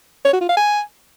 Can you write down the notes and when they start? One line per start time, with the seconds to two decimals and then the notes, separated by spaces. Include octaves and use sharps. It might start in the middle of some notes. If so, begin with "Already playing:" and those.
0.25 C#5
0.33 F#4
0.41 F4
0.49 F5
0.57 G#5